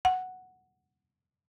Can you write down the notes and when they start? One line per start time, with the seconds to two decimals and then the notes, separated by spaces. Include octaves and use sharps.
0.05 F#5